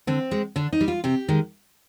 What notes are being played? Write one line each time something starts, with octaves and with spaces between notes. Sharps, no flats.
D3 C4
G#3
D3 D4
D#4
G3
F4
C3 G4
D#3 G#3